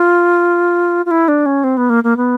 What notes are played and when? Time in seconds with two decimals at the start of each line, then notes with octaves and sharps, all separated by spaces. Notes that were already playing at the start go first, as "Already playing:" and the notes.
Already playing: F4
1.06 F4
1.11 E4
1.28 D4
1.46 C#4
1.64 C4
1.77 B3
1.89 A#3
2.04 A#3
2.17 B3